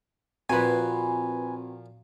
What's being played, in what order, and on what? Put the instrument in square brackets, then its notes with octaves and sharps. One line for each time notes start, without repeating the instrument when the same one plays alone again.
[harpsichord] A#2 F3 [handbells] C4 F#4 A#5 [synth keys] B4 G#5